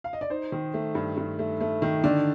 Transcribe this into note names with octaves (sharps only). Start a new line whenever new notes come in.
F5
D#5
D5
D#4 C5
D#3
A3
G2
G2
A3
A3
D#3
D3 D5